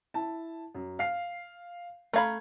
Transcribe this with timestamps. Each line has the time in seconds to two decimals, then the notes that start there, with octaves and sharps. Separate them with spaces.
0.14 E4 A5
0.75 F#2
0.99 F5 C7
2.13 A3 F5 A#5 B5 G#6